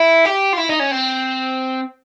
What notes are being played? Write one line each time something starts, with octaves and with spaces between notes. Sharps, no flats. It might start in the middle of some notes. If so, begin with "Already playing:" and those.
Already playing: E4
G4
F4
E4
D#4
C#4
C4